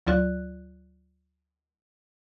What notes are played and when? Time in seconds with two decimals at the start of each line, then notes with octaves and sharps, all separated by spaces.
0.07 D2 F#3 F4 D5 F#6